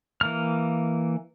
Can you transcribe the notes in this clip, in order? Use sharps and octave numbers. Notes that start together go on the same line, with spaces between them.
E3 A#3 F6